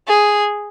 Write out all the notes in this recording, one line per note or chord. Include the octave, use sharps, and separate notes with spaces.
G#4